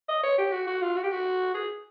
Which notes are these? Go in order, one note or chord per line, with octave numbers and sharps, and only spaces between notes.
D#5
C#5
G4
F#4
F#4
F4
F#4
G4
F#4
G#4